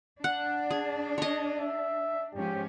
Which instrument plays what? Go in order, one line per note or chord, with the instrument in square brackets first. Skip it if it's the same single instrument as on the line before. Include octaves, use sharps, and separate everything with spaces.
[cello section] D4 [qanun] F#5
[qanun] G#4
C#5 D#5
[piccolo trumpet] E5
[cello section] G#2 F3 C#4 [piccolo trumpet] G4